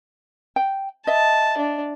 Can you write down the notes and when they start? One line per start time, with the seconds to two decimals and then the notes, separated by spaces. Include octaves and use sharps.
0.56 G5
1.07 D#5 E5 A5
1.57 D4